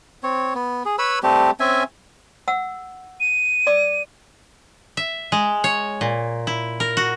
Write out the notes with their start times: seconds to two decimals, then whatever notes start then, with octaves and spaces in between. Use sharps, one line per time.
0.23 C4 C#5
0.55 B3
0.85 G#4
0.99 B4 C#5 B5 E6
1.23 G3 A3 C4 G4
1.60 C4 C#4 E5 G#5
2.48 F#5 E6
3.20 D#7
3.67 D5 D6
4.97 E5
5.32 G#3
5.64 C#5
6.01 A#2
6.47 E4
6.80 A#4
6.97 F#4